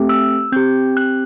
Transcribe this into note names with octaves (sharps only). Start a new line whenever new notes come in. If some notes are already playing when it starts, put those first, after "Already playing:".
Already playing: A3 C4 G4
E6
C4 G4 G6
F#6